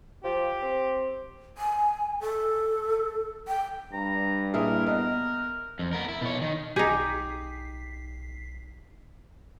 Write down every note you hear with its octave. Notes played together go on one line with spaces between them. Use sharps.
F3 G4
C4
G#5
A4
G5
G2 A#5
A#2 E4 G#4 A#4
B3 A#4 D#5
F2
B3 A#4
E4
B2 C#5
D#3
B1 D#4 G4 G#4 B6 C7